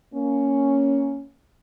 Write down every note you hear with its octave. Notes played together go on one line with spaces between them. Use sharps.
A#3 C#4